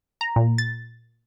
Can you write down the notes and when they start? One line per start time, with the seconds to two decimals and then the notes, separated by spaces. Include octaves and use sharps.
0.21 A#5
0.36 A#2
0.58 A6